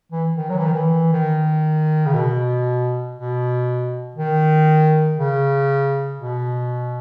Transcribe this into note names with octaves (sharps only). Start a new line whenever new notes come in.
E3
D#3
F#3
E3
D#3
E3
D#3
C#3
B2
B2
D#3
C#3
B2